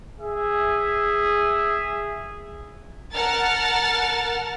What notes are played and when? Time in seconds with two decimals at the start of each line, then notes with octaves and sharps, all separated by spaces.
0.19 G#4 E5
3.14 A#4 F#5 A5 F6 A6